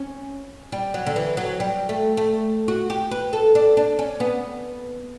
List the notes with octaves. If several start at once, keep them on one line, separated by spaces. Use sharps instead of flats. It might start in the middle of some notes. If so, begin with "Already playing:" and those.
Already playing: C#4
G3
F#3
D3
E3
F#3
G3
A3
A3
F#4
G4
B4
A4
D4
D4
C#4
B3